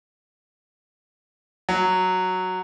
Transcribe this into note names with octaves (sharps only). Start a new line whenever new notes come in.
F#3